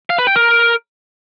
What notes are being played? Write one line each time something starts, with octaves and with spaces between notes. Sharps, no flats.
F5
B4
G5
A#4